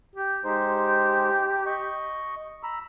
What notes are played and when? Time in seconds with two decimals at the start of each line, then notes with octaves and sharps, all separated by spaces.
0.16 G4
0.44 G#3 D#4 G4 C5
1.66 D#5 C#6
2.63 A#5 B5 E6